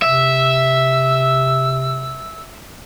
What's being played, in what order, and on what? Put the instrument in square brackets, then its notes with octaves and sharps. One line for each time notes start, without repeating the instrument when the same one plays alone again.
[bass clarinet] C3 [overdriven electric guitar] E5 [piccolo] E6